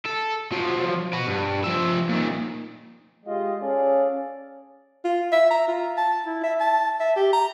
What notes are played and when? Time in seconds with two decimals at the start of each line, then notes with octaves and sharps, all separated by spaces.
0.06 A4
0.52 F3 F#3
1.13 F#4 B4
1.27 G2
1.64 F3 E5
2.09 A#2 D#3
3.25 G#3 F4 G4 D#5
3.61 C#4 G#4 A4 D5 F5
5.05 F4
5.32 E5
5.51 A#5
5.68 F4
5.97 A5
6.26 E4
6.44 E5
6.60 A5
7.00 E5
7.16 G4
7.33 A#5